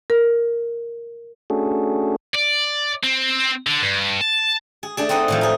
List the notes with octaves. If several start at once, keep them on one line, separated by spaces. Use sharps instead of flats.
A#4
A3 C#4 D4 F#4 G#4 A4
D5
C4
D3
G2
A5
G#4
A3 D4 G#4
C4 D#4 D#5 F#5
A2 E3 F3
D#4 G#4